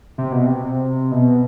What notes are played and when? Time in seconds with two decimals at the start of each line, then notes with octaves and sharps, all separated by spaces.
0.18 C3
0.32 B2
0.46 C3
1.12 B2